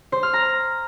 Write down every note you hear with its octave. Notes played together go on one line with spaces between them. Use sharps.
C5
F6
A#5